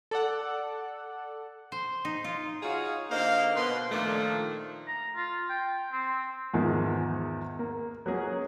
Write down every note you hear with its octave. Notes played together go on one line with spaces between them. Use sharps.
A4 D5 F#5
C5
D#4
F4
D#4 F4 F#4 G#4 C#5 F5
D3 A#3 D#4 C5 F5
B2 B4 C6
A#2 D#3 F3 A3 A#3 D4
A#5
F4
G5
C4
E2 G#2 D#3 F3
A#3
F#3 G#3 A#3 C#4 G#4 A#4